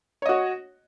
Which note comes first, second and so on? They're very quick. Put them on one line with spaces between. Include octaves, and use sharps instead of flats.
C#5 D#5 F#4